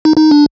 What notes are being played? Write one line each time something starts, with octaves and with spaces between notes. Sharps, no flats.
D#4
D#4
D4